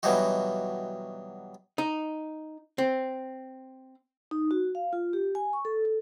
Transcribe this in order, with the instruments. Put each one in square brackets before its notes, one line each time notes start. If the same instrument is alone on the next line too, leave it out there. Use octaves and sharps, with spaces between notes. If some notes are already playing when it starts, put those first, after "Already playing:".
[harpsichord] B2 E3 F#3 G3 D#4 F#4
[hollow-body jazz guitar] D#4
C4
[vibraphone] D#4
F#4
F5
F4
G4
G#5
C#6
A4
A4